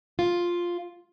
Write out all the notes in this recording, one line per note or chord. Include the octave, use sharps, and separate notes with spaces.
F4